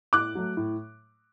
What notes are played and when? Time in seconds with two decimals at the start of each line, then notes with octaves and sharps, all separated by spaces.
0.13 A2 D6 F#6
0.35 F#3 A3
0.57 A2